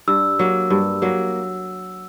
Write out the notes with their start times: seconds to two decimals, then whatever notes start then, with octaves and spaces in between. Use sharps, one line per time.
0.08 G2 E6
0.39 F#3 A#3
0.70 G2
1.02 F#3 A#3